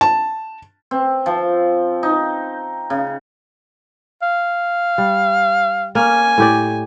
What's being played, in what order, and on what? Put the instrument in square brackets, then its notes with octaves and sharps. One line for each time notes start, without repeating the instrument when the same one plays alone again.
[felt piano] A5
[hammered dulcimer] C4
F3
D#4
C#3
[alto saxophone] F5
[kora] G3
[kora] A#3 C#4 [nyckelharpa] G#5
[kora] A2 G4 D5